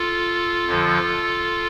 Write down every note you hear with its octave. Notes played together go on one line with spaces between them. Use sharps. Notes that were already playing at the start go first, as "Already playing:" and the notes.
Already playing: F4 A4
F2 D3 F3